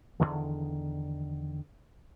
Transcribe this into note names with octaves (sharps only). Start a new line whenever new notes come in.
E2 B2 D3 D#3